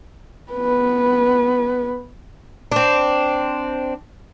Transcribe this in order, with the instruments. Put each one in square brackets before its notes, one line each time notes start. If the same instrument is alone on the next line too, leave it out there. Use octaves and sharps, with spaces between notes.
[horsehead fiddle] B3 B4
[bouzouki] C4 D4